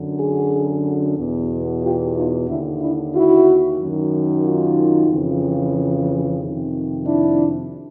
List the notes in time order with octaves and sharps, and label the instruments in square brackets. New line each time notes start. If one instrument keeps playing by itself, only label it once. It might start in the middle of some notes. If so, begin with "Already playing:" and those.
Already playing: [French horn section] F#2 D3
F#4 G#4
E2 B2
F4 G4
D#4 F4
D#2 D3 D4 E4
D4 E4
E4 F#4
F#2 D#3
D#4 F4
F2 C#3 E3
F2 C3 D#3
D4 E4